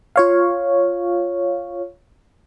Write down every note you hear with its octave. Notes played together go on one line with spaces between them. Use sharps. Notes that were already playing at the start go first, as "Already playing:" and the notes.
F4 C#5 F5